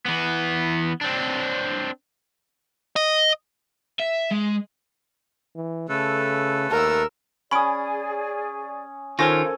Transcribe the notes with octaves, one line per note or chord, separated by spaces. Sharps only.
E3 B3
C4 D4
D#5
E5
G#3
E3
C#3 A3 A4 B4
D#2 A#4 E6
C#4 G#4 D5 B5 D#6 D7
D#3 C#4 F4 A4 A#4 C5 G#5 A#6